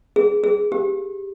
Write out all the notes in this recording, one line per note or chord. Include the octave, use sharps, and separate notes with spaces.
G#4
G#4
G4